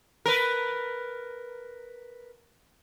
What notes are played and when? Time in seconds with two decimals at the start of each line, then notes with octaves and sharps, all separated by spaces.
0.26 A#4 B4